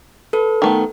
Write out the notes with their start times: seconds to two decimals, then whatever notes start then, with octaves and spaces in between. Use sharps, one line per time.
0.33 A4 B4
0.62 D#3 A3 B3